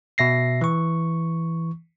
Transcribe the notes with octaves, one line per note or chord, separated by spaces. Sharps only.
B2 E5 A#6 C7
E3 C#6